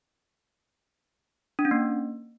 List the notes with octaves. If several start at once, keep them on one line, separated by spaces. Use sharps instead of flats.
D4
C#4
A#3